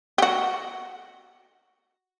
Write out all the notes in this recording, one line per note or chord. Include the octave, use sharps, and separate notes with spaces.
G4
F#4